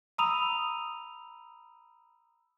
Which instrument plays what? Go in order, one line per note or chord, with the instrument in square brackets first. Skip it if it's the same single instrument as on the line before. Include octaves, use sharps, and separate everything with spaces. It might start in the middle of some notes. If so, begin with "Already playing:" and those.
[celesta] A#5 B5 D#6 E6 D#7 F7